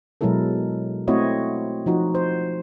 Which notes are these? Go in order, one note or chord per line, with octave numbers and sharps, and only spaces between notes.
B2 F#3 G#3 E4 A4 A#4
A3 C4 E4 F#4 C#5 D#5
F3 D#4 F#4
C5